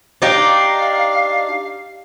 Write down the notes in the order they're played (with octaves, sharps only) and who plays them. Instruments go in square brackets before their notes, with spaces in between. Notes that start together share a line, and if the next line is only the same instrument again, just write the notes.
[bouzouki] D4 D#4 G4 [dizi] F5